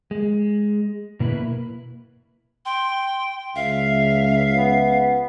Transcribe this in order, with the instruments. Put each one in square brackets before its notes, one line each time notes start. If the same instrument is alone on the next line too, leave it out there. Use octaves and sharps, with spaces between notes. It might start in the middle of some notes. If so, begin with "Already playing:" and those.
[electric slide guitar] G#3
B2 A#3 E4 B4
[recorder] G5 [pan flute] C6
[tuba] C#2 [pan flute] E5 [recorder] F5
[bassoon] B3